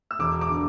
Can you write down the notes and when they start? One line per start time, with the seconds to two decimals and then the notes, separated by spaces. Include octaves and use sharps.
0.11 E6
0.19 E1 D6
0.41 D6
0.49 D3